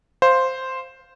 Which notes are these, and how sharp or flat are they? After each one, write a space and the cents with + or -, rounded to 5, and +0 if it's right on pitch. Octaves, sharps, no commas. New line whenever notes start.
C5 +0 F5 +0